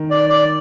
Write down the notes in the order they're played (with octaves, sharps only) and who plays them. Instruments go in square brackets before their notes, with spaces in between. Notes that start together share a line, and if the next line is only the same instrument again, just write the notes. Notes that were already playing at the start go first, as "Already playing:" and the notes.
Already playing: [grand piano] D#3
[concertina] D5
D5